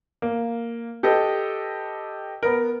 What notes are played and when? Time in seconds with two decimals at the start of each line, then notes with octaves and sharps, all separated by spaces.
0.22 A#3
1.03 G4 A4 B4 D#5
2.43 B3 A#4